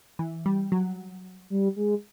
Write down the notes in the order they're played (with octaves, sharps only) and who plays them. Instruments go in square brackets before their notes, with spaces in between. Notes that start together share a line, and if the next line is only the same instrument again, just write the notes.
[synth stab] E3
G3
F#3
[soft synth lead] G3
G#3